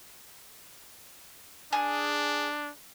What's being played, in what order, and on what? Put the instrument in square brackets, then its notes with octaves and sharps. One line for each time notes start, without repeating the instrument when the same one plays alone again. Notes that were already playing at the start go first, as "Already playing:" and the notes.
[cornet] D4 [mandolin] G#4